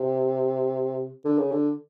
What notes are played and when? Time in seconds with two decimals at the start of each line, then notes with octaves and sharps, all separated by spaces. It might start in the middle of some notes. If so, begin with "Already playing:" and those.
Already playing: C3
1.25 D3
1.39 C#3
1.52 D3